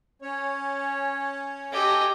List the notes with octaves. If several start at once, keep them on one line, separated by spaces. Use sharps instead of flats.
C#4 C#5
G4 A4 D#5 G#5